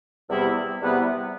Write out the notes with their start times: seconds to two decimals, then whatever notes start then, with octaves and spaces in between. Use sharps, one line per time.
0.29 E2 C3 G3 B3 E4
0.80 E2 C3 G3 B3 E4